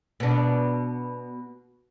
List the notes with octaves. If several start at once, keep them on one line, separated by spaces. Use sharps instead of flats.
B2 D4